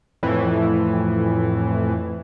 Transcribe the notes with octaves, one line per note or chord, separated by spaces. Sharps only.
F2 A2 E3